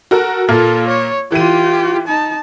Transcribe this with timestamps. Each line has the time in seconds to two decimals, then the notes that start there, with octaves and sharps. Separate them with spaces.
0.11 F#4 A4 A#4
0.49 A#2 A#3 F4 A4 F6
0.88 C#5
1.32 E3 F4 G4 D#7
2.08 D#4 A5